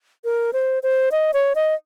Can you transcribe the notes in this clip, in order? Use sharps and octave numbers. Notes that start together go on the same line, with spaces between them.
A#4
C5
C5
D#5
C#5
D#5